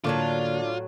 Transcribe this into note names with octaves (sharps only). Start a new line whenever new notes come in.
A2 D3 E3 F#3 A#3 D4 F4